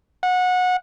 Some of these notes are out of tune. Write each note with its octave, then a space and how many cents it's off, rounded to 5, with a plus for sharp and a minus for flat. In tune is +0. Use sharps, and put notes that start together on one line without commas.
F#5 -20